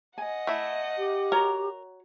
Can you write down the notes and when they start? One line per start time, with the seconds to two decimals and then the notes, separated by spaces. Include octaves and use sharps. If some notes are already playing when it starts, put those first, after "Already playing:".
0.18 D#5 F#5 G#5
0.47 A3 E4
0.98 G4
1.32 F#4 A#4 C#5 A#5